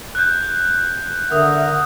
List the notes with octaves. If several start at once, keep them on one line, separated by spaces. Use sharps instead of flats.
F#6 G6
D3 A#4 E5 F#5 D#6 E6